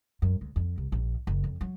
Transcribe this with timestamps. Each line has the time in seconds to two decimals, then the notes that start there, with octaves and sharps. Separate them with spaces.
0.22 F#2
0.41 D2
0.56 F2
0.78 C2
0.92 A#1
1.27 F#1
1.44 F2
1.61 F#3